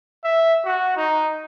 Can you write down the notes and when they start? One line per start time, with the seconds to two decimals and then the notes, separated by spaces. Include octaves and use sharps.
0.24 E5
0.65 F#4
0.96 D#4